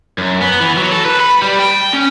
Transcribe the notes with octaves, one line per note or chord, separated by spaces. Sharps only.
F#2
B3
E3
F#3
A4
B4
B5
G3
G5
C#4